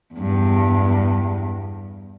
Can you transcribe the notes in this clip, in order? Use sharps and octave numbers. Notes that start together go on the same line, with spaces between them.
E2 G2